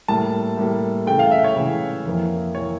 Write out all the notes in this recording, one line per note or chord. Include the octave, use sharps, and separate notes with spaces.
A2 G3 A#3 A5
A2 G3 A#3
C#3 E3 A3 G5
F5
E5
C#5
C#3 E3 A3
F2 E3 A#3
E3 A#3 C#5